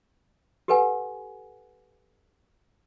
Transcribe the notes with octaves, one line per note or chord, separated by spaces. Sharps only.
G4 A4 B4 F#5 G#5